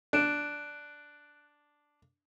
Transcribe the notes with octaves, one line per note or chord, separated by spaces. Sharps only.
D4 F#6 D7 E7